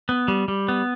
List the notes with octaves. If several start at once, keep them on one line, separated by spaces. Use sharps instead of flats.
B3
G3
G3
B3